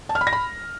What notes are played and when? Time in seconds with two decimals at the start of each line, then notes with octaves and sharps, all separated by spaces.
0.09 A5
0.15 F6
0.21 B5
0.27 A#6
0.33 B5